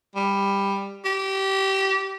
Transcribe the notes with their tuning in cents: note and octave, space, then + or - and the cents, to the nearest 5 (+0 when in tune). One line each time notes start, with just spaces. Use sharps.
G3 +15
G4 -20